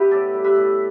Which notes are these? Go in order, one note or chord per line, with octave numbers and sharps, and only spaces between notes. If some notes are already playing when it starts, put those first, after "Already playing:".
Already playing: B3 E4 G4 B4
A2 A4 D5
G3
B4 E5
A2